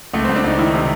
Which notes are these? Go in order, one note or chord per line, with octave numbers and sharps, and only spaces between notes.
C#2 A3
C4
C#2
D4
C#2 D#4
D#3 E4
C3